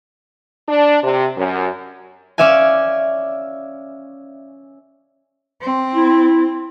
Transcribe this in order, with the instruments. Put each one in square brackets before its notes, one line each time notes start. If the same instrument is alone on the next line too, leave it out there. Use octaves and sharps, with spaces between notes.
[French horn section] D4
C3
F#2
[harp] C#4 D5 E5 F5 G#5
[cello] C4
[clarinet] E4